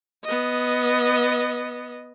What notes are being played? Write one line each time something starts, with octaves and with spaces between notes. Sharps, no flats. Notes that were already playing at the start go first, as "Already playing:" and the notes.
B3 D#5